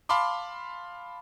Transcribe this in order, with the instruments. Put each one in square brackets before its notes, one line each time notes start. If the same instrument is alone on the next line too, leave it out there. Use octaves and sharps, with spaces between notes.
[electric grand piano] F5 A5 B5 C6 D6